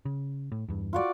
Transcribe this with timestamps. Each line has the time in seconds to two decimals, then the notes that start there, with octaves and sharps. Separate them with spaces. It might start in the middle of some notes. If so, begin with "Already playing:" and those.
0.05 C#3
0.52 A2
0.68 E2 G2
0.93 F4 F#4 D5